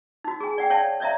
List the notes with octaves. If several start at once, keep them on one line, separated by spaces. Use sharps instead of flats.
D#4 F#4
G#4 G#5
D5 F#5 G5
C#5 D5 F5 A5
C#5 D5 E5 F5 A#5